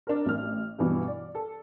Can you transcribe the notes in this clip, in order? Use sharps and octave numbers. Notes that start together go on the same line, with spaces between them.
D4 A#4
A1 F6
G2 B2 E3
D5
A4